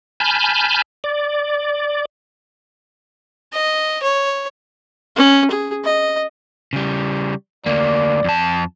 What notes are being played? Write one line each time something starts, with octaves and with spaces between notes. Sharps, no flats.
G#5 A5 B5 F6 G6
D5
D#5
C#5
C#4
G#4
D#5
C#3 G3
D2 A#3 D5
F2 A5